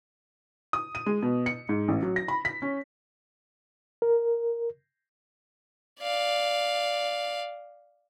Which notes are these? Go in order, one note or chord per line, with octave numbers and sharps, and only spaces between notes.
D#6
D#7
G#3
B2
C#7
G#2
A1
F#3
A#6
B5
B6
C#4
A#4
D5 F5